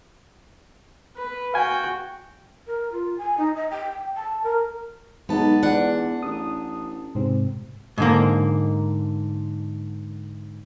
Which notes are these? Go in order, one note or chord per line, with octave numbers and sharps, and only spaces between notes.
B4
F#4 F5 G5 G#5
A#4
F4
G#5
D#4
D#5
G5
A5
A#4
B1 G#3 B3 D#4 A5
E2 D4 F#5
A1 D#6
G#2 C3 C4
G#2 D3 A#3